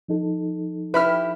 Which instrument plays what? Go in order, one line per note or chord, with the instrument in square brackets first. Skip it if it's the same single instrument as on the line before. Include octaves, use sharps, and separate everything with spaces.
[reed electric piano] F3 D#4 A4
[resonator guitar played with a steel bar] E4 G4 [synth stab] B4 B5 F6